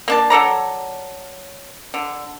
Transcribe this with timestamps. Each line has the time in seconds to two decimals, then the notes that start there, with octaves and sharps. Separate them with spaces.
0.08 A#3 D4 A5
0.30 F#3 A4 D5 A#5
1.94 D3